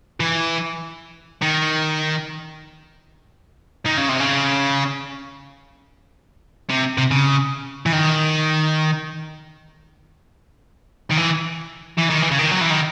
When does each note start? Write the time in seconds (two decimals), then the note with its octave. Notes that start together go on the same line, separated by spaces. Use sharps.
0.20 E3
1.42 D#3
3.86 D#3
3.98 C#3
4.09 C3
4.20 C#3
6.70 C3
6.98 C3
7.11 C#3
7.86 E3
7.93 D#3
11.11 D#3
11.17 E3
11.98 E3
12.10 D#3
12.23 E3
12.31 C#3
12.39 D#3
12.51 F#3
12.61 E3
12.70 D#3